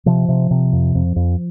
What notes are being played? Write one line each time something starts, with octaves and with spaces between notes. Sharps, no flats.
C3 F3
C3
C3
F2
F2
F2